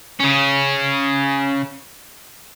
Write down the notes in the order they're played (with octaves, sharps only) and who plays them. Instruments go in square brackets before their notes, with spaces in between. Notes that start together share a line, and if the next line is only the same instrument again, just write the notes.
[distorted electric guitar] C#3 C#4